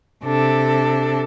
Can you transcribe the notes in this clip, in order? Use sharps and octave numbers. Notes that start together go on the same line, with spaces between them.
C3 D4 A4